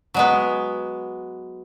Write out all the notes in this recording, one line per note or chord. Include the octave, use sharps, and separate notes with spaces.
F#3 G#3 B3